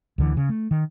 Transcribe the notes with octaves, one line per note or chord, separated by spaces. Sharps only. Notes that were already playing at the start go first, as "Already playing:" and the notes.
D2 D3 E3
C#3
A3
D#3